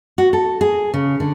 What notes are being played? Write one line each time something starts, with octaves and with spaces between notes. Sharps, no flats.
F#4
A4
G#4
C#3
D3